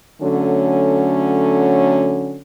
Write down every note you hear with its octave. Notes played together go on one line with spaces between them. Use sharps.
D3 F#3 A3 C#4